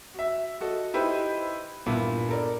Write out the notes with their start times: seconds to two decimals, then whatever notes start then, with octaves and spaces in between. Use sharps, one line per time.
0.14 F#4 E5
0.61 F#4 A4 D#5
0.94 D#4 E4 G4 B4 C5
1.86 G2 A#2 A#3 B3 E4
2.29 A4 A#4 D5